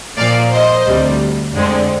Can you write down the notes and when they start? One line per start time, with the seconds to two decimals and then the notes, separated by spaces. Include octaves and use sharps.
0.17 A#2 F3 A#3 D5 F5
0.52 C5 D#5
0.87 D2 C3 G3
1.55 F2 D3 G#3 C4